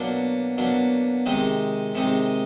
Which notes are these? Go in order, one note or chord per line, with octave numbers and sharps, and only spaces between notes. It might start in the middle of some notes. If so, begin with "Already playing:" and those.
Already playing: B2 F#3 A#3 D4
B2 F#3 A#3 D4
C3 D#3 G#3 C4 D#4
C3 D#3 G#3 C4 D#4